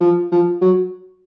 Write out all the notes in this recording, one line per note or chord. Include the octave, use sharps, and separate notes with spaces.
F3
F3
F#3